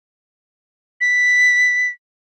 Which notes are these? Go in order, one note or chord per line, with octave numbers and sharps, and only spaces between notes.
B6